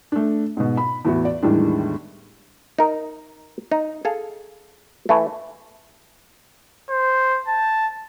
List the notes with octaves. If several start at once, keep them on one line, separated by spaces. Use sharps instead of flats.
A3 D4
G#2 B2
B5
E2 A2 B3 E4 F#4
D5
E2 A2 D#3 G3 G#3 D4
D#4 A#4
D#4
G#4 A4 F5
E3 A3
C5
A5